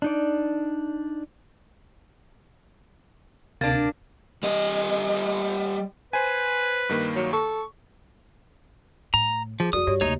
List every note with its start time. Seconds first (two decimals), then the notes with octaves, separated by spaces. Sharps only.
0.02 D4 D#4 D5
3.61 D2 C3 A#3 D4 A6
4.43 G3 D#5
6.13 B4 C5 G#5
6.89 G2 D#3 A#3
7.16 F#3
7.33 A4 C#6
9.14 A2 A#5
9.60 F3 G#4
9.73 F2 E4 F#4 A#4 D5 D#6
9.87 G2 G4 C#5 D#5
10.01 D#2 C#3 A3 D#4 C#5